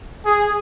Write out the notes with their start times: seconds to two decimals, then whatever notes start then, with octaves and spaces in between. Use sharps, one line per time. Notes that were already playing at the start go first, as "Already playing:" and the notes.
0.26 G#4